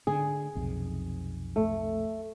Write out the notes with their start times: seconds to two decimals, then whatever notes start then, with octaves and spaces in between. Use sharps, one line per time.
0.07 D3 G#4
0.55 B1 F2 C3
1.56 A3